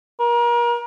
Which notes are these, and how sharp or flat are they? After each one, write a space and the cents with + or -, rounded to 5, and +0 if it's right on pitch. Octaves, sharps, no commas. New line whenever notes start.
A#4 +35